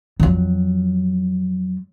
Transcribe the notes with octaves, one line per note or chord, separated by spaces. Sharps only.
F2 F#3